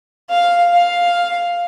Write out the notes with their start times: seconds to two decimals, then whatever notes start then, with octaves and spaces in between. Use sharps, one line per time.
0.30 F5
0.73 F5